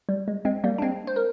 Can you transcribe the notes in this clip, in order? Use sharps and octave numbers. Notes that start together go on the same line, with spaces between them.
G3
G#3
G#3 C4
G3 A#3
D4
G#3 C4
C5
A#4